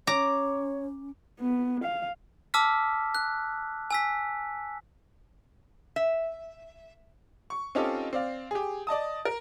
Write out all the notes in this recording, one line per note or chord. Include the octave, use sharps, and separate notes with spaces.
C#4 C#5 A#5 D6
B3
F5
A5 D6 E6 F6 B6
F#6
G#5 E6 B6
E5
C#6
C4 C#4 D#4 F4 G4 A4
C4 D5 F5
G4 G#4
D5 D#5 A5 D#6
A#4